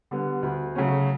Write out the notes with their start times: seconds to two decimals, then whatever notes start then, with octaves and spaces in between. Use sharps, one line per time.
0.11 D3 G3 B3
0.42 D2
0.75 C#3 F#3 A3 C#4